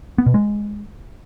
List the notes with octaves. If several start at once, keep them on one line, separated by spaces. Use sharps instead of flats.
B3
B2
G#3